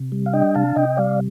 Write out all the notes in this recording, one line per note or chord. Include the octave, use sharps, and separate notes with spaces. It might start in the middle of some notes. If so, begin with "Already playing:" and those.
Already playing: C3
G3
F5
D4 D#5 G5
C3 F5 A5
C3 D#5 G5
G3 D5 F5